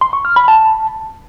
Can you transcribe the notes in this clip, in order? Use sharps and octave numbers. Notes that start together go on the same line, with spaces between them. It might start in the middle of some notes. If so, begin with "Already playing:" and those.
C6
C#6
F6
B5
A5